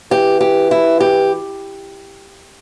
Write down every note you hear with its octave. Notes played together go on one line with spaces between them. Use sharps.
E3 G4
G4
E4
G4